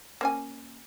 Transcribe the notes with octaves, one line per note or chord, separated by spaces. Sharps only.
A#3 C#4 G#5